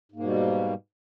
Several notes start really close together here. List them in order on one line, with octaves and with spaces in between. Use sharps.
G#2 A#3 B2 G3